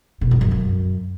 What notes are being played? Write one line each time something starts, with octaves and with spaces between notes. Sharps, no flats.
B2
G#2
F#2
F#2